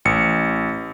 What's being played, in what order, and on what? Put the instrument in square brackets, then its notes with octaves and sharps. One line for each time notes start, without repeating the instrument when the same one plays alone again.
[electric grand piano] A1 C#7